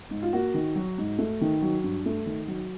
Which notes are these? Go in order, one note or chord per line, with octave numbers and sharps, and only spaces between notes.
G#2
F4
A#3 F#4
D#3
F#3
G#2
A3
D#3
F#3
G2
A3
D#3
F#3